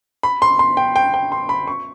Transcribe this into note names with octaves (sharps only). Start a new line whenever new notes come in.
B5
C6
C6
G5
G5
G5
C6
B5
C#6